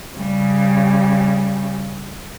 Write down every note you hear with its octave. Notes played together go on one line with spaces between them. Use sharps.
C#3 G3